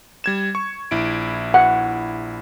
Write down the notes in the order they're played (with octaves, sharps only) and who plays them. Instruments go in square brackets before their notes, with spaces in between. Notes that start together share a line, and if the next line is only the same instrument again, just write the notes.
[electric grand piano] G3 G#6 E7
C#6
A#1 E4 D7
[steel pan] F#5